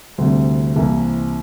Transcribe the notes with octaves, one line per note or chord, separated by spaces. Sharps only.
D2 C3 G3
C2 C3 E3 A#3